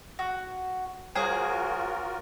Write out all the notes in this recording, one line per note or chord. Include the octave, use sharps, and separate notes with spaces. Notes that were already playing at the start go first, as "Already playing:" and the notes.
F#4
G3 F4 F#4 G#4 A#4 C#5 D#6